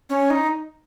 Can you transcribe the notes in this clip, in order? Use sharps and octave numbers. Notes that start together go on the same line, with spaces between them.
C#4
D#4